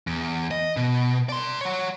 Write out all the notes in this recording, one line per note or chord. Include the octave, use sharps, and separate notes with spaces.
E2
D#5
B2
D5 C6
C#5 F#5